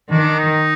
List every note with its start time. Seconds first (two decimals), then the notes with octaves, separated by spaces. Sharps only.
0.10 D#3 D4
0.39 D#4